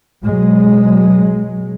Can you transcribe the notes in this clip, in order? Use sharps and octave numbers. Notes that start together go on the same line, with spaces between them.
B2 F#3 G#3